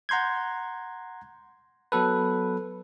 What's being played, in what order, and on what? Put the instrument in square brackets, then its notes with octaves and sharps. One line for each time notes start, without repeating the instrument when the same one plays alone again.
[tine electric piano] F#5 A#5 C6 G6 G#6
F#3 B3 A4 B4